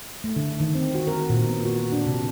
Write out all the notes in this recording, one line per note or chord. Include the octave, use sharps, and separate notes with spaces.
A3
D3
D#3
C4
F#4
A#4
A#2
B3
F#4
D4
C3